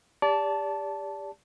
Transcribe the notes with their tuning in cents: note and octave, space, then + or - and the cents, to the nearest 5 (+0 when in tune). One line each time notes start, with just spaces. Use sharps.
G4 +30 D5 -30 A5 +0